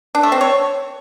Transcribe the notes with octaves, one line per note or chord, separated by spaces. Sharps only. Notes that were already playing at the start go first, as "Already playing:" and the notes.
D4
A3
C4
C#5